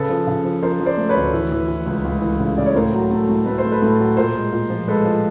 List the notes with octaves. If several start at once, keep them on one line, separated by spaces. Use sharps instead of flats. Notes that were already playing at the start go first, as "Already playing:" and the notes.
Already playing: C#3 A4 B4
F3
C#3
F3
F3 A#4 C5
F3
C5 D5
A3
B4 C#5
D2
E3
E3
E3
C#2
C#2
E3
C#3
C#3 D5
C#5
A2 A#4 C5
F#3
A3
A2
A3 B4
C5
A3
A4 B4
A2
F#3
A#2 A#4 C5
G#3
A#2
F3
G#3 A4 B4
F3